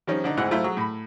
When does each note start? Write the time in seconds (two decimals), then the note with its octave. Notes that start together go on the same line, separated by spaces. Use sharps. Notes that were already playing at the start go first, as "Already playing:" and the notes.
0.07 D#3 F3 G3 C4 C#4 D#4
0.24 D3 D4 D#4
0.37 D2 G#2 C4 E4 F#5 F#6
0.51 F#3 A3 E4 F4 C5 E5
0.64 F#3 G#4 C#6
0.77 A2 B5